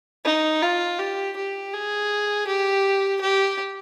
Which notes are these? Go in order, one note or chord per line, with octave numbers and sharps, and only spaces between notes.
D#4
F4
G4
G4
G#4
G4
G4